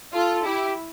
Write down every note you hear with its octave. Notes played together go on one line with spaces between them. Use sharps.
F4 A4
E4 G4